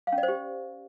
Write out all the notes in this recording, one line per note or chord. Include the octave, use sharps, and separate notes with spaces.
F5
C#4
D5
C5
G4